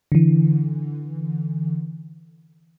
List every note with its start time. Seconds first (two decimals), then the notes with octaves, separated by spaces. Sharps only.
0.12 D3 E3